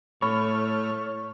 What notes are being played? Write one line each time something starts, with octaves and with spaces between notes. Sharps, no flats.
A2 A3 C#5 B5 C#6 F6